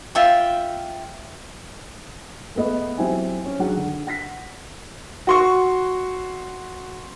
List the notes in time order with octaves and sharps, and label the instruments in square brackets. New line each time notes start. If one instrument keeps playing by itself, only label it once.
[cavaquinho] F4 E5 G5
[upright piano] G#3 A3 B3 D#5
F#3 C4 E4 G4 G#5
C#4
F#3 D4 G#4 F#5
D3
F#5 A#6 B6
F#4 C6 C#6